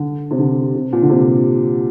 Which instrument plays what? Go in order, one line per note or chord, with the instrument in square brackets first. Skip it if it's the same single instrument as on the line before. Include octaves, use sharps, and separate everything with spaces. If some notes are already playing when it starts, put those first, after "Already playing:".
Already playing: [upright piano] D3
C3
D3
C3
A#2
D3
C3